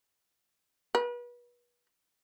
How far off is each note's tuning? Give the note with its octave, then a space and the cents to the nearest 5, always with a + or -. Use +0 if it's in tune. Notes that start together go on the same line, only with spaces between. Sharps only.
B4 -35